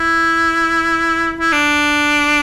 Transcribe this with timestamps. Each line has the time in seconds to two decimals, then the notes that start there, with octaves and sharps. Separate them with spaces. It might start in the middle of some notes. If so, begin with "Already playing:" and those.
Already playing: E4
1.40 E4
1.52 D4